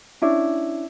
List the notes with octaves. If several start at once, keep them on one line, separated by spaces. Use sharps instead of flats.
C#4 D4 E4